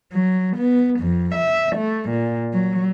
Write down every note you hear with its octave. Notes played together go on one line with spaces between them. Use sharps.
F#3
B3
F2
E5
A3
A#2
F#3